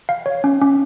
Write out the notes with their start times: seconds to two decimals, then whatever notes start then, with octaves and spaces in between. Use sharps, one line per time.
0.09 F5
0.26 C#5
0.44 C#4
0.61 C#4